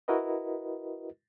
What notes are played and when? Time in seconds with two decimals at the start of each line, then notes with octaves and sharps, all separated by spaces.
0.08 E4 F#4 A#4 B4 D#5